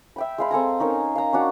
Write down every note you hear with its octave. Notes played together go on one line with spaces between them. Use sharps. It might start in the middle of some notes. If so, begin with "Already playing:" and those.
E5 G5 B5
G#3 F5 B5
C4 A4 G#5 A#5
C#4 D#4 A#4
F5 A#5
C#4 D4 F#4